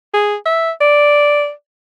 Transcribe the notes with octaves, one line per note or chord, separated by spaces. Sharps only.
G#4
E5
D5